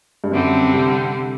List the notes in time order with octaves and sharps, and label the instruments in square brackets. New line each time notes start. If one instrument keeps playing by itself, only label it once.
[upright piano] G2
[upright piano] F#2 [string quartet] D3 G3 C4
[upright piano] C3